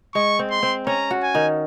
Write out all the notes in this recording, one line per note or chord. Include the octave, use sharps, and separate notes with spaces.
G#3 C#6
C4
C6
C4
C#4 A#5
F#4
G#5
D#3